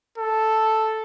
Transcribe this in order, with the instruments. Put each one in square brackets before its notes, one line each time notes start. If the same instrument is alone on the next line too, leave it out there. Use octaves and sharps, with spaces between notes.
[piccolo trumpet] A4